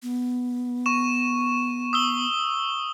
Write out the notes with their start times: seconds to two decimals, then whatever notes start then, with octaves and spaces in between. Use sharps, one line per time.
0.03 B3
0.86 C#6 E7
1.93 D#6 E6 G7